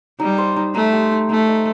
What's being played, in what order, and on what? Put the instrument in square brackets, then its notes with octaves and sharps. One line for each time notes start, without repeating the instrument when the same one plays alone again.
[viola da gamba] G3 [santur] D#4
[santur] C5
D#4
[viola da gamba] A3 [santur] D#4
[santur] G4
D#4
[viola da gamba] A3 [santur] D#4
[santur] D#5